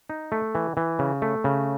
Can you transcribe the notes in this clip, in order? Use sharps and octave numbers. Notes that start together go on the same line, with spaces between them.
D#4
A3
E3
E3
C#3
A3
C#3